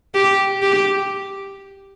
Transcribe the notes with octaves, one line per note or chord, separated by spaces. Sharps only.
G4
G4